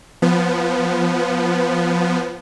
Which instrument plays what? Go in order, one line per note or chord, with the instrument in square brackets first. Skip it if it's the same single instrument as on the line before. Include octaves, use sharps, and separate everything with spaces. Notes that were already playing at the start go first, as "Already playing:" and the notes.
[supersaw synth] F3 B3